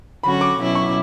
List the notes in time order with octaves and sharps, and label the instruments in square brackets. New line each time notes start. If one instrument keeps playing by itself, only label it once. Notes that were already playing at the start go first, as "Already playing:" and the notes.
[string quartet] D3 F#3 C#4 F#4 [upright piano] B5
[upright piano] D6
[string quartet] B2 F#3 C#4 E4
[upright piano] C#6